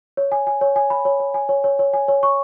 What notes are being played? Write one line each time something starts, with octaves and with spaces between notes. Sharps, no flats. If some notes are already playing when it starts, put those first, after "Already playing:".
C#5
G#5
G#5
C#5
G#5
B5
C#5
C#5
G#5
C#5
C#5
C#5
G#5
C#5
C#6